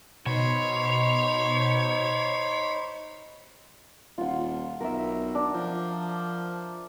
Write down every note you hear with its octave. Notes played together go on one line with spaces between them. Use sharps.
B2 D#4 C5 C#5 B5
D#1 F4 F#5
B1 A#4 E5
D4
F3